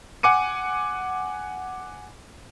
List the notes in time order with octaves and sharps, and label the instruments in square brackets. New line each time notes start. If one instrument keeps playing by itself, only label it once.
[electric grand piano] F#5 G#5 D6 C#7 D#7